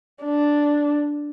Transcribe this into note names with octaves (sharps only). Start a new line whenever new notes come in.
D4